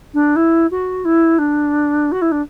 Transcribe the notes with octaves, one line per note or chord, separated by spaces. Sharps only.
D4
E4
F#4
E4
D4
F#4
E4
D4